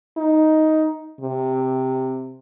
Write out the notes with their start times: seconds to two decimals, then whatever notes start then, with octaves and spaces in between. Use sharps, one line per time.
0.17 D#4
1.21 C3